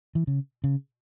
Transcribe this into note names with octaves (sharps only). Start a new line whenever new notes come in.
E3
C#3
C#3